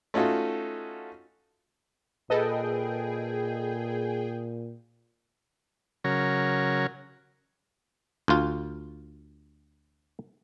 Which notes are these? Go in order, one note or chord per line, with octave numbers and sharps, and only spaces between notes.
A3 C#4 D#4 F4 F#4 A4
A#2 G#4 A4 B4 D#5 G5
C#3 F#3 A#4 C#5
D2 F4